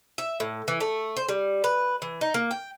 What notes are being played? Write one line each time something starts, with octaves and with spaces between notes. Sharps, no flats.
E5
A2
E3
A3
C5
G3
B4
E3
D#4
A#3
G5